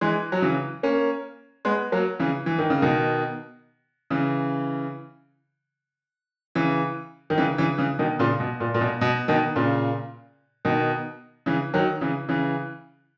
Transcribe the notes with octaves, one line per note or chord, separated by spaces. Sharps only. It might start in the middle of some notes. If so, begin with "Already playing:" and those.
E3 G#3
F#3
C#3 E3
A#3 C#4
G#3 B3
F#3 A#3
C#3 E3
E3
D#3
C#3
B2 D#3
C#3 E3
C#3 E3
D#3
C#3 E3
C#3 E3
C#3 E3
B2 D#3
A#2 C#3
B2
A#2
A#2
B2
B2
B2 D#3
A#2 C#3
B2 D#3
C#3 E3
D#3 F#3
C#3 E3
C#3 E3